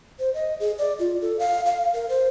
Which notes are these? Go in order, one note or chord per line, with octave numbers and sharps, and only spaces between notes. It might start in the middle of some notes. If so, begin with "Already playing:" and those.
C5
D#5
G#4
D5
F4
A4
F5
F5
A#4
C5